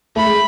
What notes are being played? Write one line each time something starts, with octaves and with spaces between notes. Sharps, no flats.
A3 B5
G#3